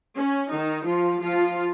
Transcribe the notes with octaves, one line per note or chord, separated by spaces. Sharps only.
C#4
D#3 D#4
F3 F4
F3 F4